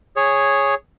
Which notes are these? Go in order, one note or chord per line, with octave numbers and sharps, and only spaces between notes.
G#4 C#5